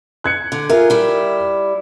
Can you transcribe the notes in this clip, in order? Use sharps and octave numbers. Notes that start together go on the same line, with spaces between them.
F#6 G#6 C#7
D3
F4 G#4 A#4 E5
G3 E4